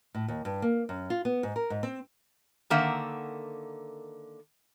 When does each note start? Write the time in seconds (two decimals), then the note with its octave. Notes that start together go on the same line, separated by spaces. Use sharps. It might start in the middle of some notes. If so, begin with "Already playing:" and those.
0.14 A2
0.28 D#2
0.45 G2
0.62 A#3
0.89 F#2
1.10 F4
1.25 B3
1.43 G#2
1.56 A#4
1.70 G#2
1.83 C4
2.70 D3 D#3 A#3 E5 F#5